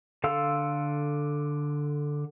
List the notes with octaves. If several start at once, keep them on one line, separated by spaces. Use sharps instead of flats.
D3 A4 F5 C6 E6